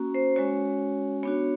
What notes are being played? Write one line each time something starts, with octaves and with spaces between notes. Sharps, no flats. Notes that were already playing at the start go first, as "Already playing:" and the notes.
Already playing: A#3 C#4 F#4
C5
G#3 C#4 F#4 C#5
B3 D4 F#4 C#5